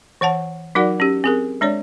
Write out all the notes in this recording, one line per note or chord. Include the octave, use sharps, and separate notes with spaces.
E3 C#5 F#5 A5
F#3 D#4 F#4 A#4 D5 F#5
C#4 G4
C4 G#4 A#4
G#3 D4 C#5 D5